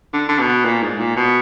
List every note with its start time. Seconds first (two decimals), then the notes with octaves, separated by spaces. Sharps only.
0.13 D3
0.29 D3
0.39 B2
0.65 A#2
0.82 G#2
0.99 A#2
1.17 B2